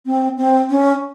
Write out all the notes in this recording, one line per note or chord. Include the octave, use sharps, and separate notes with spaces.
C4
C4
C#4